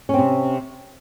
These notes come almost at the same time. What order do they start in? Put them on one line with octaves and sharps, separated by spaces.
C#4 C4 C3